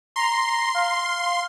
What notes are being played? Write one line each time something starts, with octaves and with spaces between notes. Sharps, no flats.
A#5 C6
F5